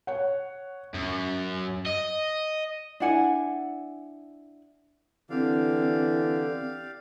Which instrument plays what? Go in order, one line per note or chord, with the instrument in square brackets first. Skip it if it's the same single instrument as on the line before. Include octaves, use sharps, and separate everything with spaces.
[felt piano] C#5 F#5
[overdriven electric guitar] F#2
D#5
[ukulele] D4 E4 F#5 G#5
[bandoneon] D3 [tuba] E3 [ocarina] C4 [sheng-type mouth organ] G4 D5 F5